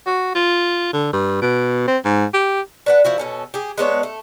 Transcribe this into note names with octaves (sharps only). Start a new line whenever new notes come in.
F#4
F4
D3
G2
B2
C4
G#2
G4
D4 B4 F#5
F3 E4 F#4
B2 C#4 A4
G4 G#4
G#3 B3 D4 C#5
A3